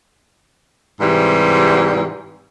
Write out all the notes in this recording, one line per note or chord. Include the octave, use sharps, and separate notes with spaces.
G#2 C3 E3 G3